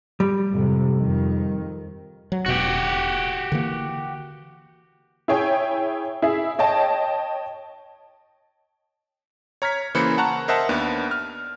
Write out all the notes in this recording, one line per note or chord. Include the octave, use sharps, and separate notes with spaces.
G3
F2 G#2 C3
F2 D#3
F#3
E1 B2 F#4 G4
D3 E3 A#3
E4 G#4 C#5 G5 G#5
E4 G#4 E5
C#5 D#5 G5 A5
C#5 A#5 F6 G#6 B6
C#3 E3 A#3 C5 B5 C#7
F#5 A5 A#5 C#6 F#6
A#4 C5 D#5 E5 F#5 A5
D#2 B3 D4
F6